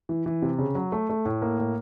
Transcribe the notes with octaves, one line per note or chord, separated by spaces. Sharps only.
E3
E3
C3
C#3
F#3
A3
A3
A2
A#3
A2